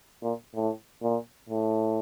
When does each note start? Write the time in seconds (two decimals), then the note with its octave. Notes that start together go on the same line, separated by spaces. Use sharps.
0.23 A#2
0.55 A2
1.02 A#2
1.49 A2